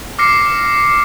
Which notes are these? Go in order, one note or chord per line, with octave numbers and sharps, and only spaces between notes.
D6 F6 A#6 C7 C#7